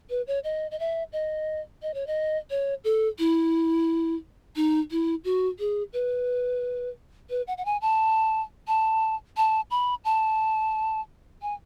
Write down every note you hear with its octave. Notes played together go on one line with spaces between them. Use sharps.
B4
C#5
D#5
D#5
E5
D#5
D#5
C#5
D#5
C#5
A4
E4
D#4
E4
F#4
G#4
B4
B4
F#5
F#5
G#5
A5
A5
A5
B5
A5
G#5